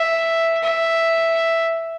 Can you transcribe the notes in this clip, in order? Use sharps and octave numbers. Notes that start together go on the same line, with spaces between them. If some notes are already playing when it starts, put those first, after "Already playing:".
Already playing: E5
E5